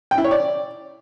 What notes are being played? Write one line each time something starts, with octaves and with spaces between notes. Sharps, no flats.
G5
E4
C#5
D5